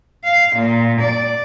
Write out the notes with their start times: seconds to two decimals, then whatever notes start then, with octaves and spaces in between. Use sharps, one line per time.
0.24 F5
0.56 A#2
1.01 D5